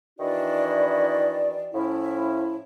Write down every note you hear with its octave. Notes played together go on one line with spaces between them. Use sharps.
D#3 E3 D4 E4 F#4 D5
A2 F3 C#4 E4